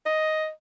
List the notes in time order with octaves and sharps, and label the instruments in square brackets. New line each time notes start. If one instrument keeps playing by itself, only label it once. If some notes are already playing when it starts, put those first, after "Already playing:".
[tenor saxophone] D#5